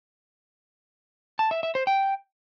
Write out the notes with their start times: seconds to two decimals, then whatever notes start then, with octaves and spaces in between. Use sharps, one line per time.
1.39 A5
1.51 E5
1.63 E5
1.75 C5
1.87 G5